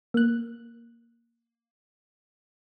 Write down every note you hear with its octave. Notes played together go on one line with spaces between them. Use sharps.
A#3 F#6